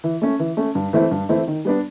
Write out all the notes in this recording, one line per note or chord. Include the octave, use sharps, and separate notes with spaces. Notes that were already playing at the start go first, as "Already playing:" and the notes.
E3
A3 C#4
E3
A3 C#4
G2
E3 A3 C4 E4
G2
E3 A3 C4 E4
D#3
G3 B3 D4